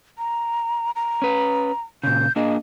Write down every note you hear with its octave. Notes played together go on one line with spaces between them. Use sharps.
A#5
A#5
C#4 B4
A#2 C#3 G6
A#3 D4 G#4 D#5